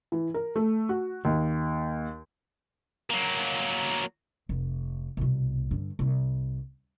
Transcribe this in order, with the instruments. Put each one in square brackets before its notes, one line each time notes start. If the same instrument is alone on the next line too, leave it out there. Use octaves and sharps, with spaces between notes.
[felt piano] E3
A#4
A3
F#4
D#2
[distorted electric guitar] F#3 A#3
[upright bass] F1
C2 B2
G2 D3
C2